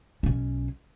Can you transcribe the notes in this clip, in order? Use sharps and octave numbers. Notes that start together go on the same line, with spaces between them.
B1 C#4